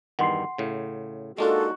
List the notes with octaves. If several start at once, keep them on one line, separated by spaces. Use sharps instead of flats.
E2 G2 D#3 F#5 C6 C7
A2 C#3
G#3 A#3 D4 D#4 F4 F#4 A4